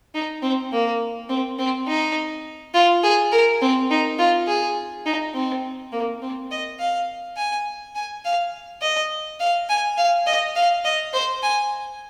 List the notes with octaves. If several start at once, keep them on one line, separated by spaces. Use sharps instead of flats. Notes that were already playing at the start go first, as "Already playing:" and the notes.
D#4
C4
A#3
C4
C4
D#4
F4
G#4
A#4
C4
D#4
F4
G#4
D#4
C4
A#3
C4
D#5
F5
G#5
G#5
F5
D#5
F5
G#5
F5
D#5
F5
D#5
C5
G#5